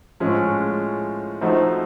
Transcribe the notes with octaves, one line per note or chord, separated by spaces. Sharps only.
A2 F3 G#3 C#4 F4
F3 A3 C4 D#4 F#4